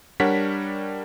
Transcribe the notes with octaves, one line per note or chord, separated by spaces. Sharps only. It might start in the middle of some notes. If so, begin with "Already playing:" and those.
G3 D4 A#4 C#5 F#5 B6